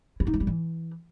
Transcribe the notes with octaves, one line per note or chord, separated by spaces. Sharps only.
E4
D#4
A3
G3
E3